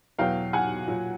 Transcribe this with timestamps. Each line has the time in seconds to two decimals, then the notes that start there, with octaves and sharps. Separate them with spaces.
0.18 E2 B2 F#3 F5 G5
0.53 F#5 G#5
0.88 A#2 F#3